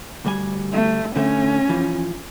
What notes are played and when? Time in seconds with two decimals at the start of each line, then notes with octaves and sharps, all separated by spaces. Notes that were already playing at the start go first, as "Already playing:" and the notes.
0.25 D2 G3 G#5
0.73 A3
1.16 D3 A3 C#4
1.69 E3 F3